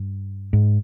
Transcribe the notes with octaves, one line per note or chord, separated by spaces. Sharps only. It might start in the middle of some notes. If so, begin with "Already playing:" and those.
Already playing: G2
G#2